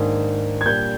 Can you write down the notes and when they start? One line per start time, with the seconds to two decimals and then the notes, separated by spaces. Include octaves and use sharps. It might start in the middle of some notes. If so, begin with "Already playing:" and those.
Already playing: G#2 D#3 A#3 D4
0.61 G#6
0.65 A#2 G3 D4 G6